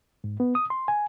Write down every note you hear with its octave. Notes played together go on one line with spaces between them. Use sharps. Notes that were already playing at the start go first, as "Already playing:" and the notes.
G#2
B3
D#6
C6
G#5